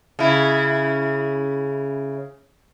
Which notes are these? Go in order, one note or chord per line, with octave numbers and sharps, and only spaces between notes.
C#3 E4